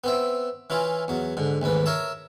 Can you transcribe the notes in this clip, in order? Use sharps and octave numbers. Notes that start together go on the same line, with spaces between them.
B3 C4 E5
E3 C#4 E4 F4
E2 F#3
G#2 D3
A1 D#2 G#2 B4
A#4 C#5 E5 A5